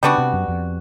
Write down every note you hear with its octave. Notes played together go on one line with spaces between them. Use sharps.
C#3 G3 B3 D4 F#4
C3
F#2
F2